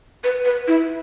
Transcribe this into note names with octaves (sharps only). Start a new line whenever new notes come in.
B4
B4
E4